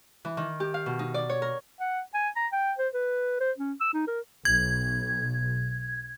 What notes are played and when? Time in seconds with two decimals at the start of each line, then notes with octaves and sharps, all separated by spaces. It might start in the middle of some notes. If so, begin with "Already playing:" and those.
0.25 E3
0.37 D#3
0.60 G4
0.74 F5
0.86 B2
0.99 D#4
1.14 D5
1.29 C#5
1.42 A#4
1.80 F#5
2.14 G#5
2.36 A#5
2.52 G5
2.78 C5
2.94 B4
3.40 C5
3.58 C#4
3.81 E6
3.94 D#4
4.08 A#4
4.45 B1 G#6